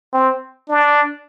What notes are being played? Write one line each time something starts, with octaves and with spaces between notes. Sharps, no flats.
C4
D4